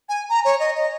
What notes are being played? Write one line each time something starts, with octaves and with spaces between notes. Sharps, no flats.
G#5
A#5
C#5
D#5
D#5